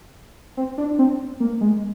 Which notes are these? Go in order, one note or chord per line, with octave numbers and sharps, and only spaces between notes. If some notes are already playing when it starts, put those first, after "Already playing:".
C4
D4
C4
A#3
G#3